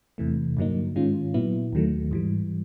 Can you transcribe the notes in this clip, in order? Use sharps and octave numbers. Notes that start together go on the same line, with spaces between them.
E2 C3 E3 A3
G2 D3 F#3 A#3 D#4
G#2 D#3 G#3 C#4 F4
A#2 F#3 B3 E4
D#2 D#3 F#3 A3
G#2 E3 G3